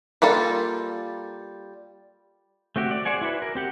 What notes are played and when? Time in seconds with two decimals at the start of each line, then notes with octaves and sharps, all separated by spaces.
0.22 G3 A#3 F4 A4
2.76 A3 C4 F#4 G4
2.91 D5
3.05 G#4 C5 D5 F#5 G#5
3.21 E4 F#4 B4
3.42 A#4
3.55 C4 G4 F#5